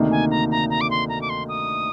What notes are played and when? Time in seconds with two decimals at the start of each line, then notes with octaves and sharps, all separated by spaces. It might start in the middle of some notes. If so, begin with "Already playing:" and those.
Already playing: D2 C3 D#3 A#3 D#4
0.11 G#5
0.31 A#5
0.51 A#5
0.70 A#5
0.81 D6
0.91 C6
1.09 A#5
1.22 D6
1.30 C6
1.49 D#6